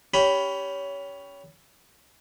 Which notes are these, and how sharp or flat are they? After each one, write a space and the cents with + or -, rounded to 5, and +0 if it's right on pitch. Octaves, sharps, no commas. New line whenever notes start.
C#4 +25 G4 +0 B5 +0